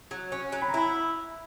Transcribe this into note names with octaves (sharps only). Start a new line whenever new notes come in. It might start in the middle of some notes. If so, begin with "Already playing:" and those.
F#3
C#4
F#3
B5
A#5
E4 B5